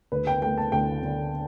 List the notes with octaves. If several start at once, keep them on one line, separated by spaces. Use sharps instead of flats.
D2 B4
G5
A3 G5
A5
D2 G5
D3